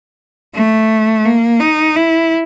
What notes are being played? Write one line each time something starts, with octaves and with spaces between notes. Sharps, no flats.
A3
A#3
D#4
E4